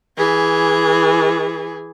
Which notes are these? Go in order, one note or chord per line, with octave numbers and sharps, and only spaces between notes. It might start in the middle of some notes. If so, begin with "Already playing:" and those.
E3 G#4